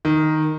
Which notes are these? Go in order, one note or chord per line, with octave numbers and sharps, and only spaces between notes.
D#3